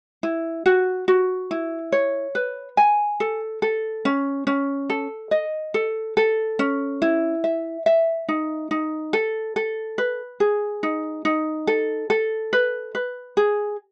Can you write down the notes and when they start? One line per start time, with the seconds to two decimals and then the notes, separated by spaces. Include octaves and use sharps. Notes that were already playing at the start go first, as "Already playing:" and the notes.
0.23 E4
0.66 F#4
1.08 F#4
1.51 E4
1.92 C#5
2.35 B4
2.77 G#5
3.20 A4
3.62 A4
4.05 C#4
4.47 C#4
4.90 A4
5.31 D#5
5.74 A4
6.17 A4
6.59 C#4
7.02 E4
7.44 E5
7.86 E5
8.28 D#4
8.71 D#4
9.13 A4
9.56 A4
9.98 B4
10.40 G#4
10.83 D#4
11.25 D#4
11.67 A4
12.10 A4
12.53 B4
12.95 B4
13.37 G#4